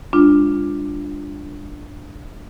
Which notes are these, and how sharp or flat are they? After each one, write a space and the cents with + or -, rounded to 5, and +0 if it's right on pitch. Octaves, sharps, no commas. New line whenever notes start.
G#3 -45 D4 +0 F4 +0